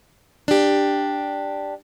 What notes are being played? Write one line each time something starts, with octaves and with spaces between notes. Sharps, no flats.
D4 G4